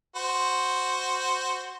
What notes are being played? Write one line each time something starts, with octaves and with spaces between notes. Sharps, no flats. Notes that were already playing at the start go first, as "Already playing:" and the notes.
F#4 C5